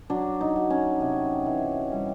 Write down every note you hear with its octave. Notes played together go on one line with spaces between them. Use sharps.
F#3 D4
D#4
F#3
C#4
C3
E3
G3